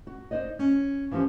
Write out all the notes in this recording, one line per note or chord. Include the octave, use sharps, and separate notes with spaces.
F#4
D#4 C5 D5 D#5
C#4
E3 F3 C#4 G4 C5